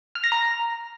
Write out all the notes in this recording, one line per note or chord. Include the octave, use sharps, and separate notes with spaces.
F6
A#6
A#5